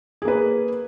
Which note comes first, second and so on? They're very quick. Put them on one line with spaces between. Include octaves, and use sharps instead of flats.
G#4 A#3 B4